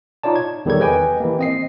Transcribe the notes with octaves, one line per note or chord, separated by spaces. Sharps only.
D#4 F4 C#5 D5 A5
G#6
E2 D#3 G3 A4 C#5 G#6
G4 B4 D#5 G5 G#5
E3 A#3
C4 D#5 C7